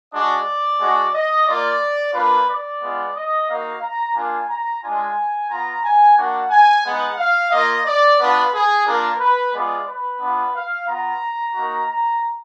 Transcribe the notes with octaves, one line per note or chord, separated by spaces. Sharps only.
G#3 D4 F#4 D5
G#3 D4 F#4
D#5
A#3 F4 D5
A#3 D4 F4 B4
D5
G#3 B3 F4
D#5
A#3 D#4 F#4 F5
A#5
A#3 D4 F4 G#5
A#5
G#3 D4 F4 G#5
B3 F4 A#5
G#5
A#3 D4 F#4 F#5
G#5
G#3 B3 D#4 F#5
F5
A#3 F4 D#5
D5
B3 D4 F4 B4
G#4
A#3 D4 F4 A#4
B4
G#3 B3 F4 D5
B4
B3 D4 F4
F5
B3 F4 A#5
A#3 D#4 F#4
A#5